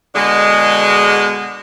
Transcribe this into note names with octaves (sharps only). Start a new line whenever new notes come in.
B2 D3 G#3